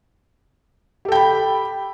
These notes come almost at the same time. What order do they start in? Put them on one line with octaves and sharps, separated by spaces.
G4 A4 G5 B5